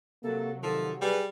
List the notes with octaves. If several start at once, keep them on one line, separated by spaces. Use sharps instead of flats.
C3 F#3 A#3 A4
D#3 F3 A4
G3 G#4 B4